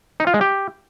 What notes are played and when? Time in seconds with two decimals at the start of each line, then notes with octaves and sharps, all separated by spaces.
0.20 D#4
0.27 F4
0.34 G#3
0.41 G4